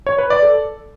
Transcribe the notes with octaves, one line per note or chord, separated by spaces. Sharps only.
C#5
B4
D5
A4